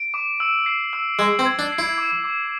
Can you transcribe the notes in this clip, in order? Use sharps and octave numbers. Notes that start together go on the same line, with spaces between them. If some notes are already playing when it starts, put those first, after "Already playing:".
Already playing: D7
D6
E6
C7
E6
G#3 E6
C4
G#6
D4
C7
E4
D6
D6